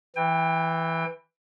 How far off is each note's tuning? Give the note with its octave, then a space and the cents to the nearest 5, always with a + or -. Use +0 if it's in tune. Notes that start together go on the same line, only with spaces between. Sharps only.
E3 +0 G5 +25